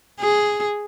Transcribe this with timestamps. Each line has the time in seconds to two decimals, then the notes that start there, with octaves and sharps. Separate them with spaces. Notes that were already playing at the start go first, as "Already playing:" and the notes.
0.20 G#4